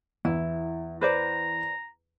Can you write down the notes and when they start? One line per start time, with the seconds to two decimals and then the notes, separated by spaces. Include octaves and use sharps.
0.25 E2 E4
1.01 B4 C5 D5 A#5